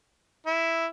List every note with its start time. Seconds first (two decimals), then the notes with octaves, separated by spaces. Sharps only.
0.46 E4